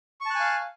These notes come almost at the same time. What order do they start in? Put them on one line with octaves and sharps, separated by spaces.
C#6 A5 F#6 G#5 F5